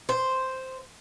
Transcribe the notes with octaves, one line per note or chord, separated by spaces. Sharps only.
C5